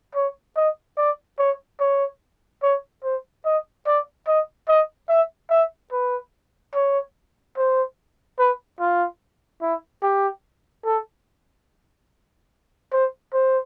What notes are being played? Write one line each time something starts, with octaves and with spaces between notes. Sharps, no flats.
C#5
D#5
D5
C#5
C#5
C#5
C5
D#5
D5
D#5
D#5
E5
E5
B4
C#5
C5
B4
F4
E4
G4
A4
C5
C5